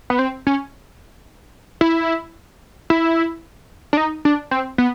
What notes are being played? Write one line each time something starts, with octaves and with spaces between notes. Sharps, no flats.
B3
C4
C#4
E4
E4
D4
D#4
D4
C4
B3